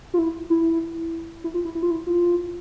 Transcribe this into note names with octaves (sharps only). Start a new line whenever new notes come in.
F4
E4
E4
E4
F4
E4
E4
F4
E4
F4